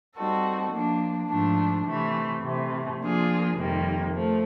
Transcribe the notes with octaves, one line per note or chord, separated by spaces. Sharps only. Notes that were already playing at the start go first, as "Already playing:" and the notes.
G3 C4 D#4 F#4 A4
F3 A#3 D4
G#2 F3 A3 D4
C3 E3 A3
C3 E3 A3
F3 A#3 D4 F4 G#4
F2 C3 D#3 G3 A#3
F3 A3